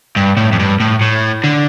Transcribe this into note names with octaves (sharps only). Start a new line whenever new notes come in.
G2
A2
F2
G2
A2
A2
D3